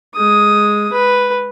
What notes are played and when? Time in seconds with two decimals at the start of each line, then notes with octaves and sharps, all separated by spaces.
0.16 G#3 D#6
0.92 B4